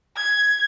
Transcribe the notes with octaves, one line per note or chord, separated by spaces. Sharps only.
G#6